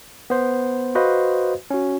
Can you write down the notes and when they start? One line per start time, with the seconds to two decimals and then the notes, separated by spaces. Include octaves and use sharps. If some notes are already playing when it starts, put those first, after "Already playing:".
0.30 B3 C5
0.95 F#4 B4 C5 D#5 F5
1.70 C#4 F#4